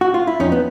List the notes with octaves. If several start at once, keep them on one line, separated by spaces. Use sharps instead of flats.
F#4
F4
E4
F2 C#4 D#4
B3